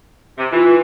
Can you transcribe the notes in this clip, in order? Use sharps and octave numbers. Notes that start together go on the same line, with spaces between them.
C3
E3 F4